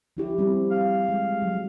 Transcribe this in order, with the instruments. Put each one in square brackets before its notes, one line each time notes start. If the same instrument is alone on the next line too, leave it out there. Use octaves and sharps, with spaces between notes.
[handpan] F3 E4 G4
G3 C4
[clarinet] F5
[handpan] G#3
F#3